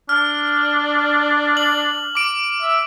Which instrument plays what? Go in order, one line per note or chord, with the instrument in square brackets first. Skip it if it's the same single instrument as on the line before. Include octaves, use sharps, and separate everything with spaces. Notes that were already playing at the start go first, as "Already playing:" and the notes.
[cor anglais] D4 [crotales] F6
[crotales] F#7
D6 D7
[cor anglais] E5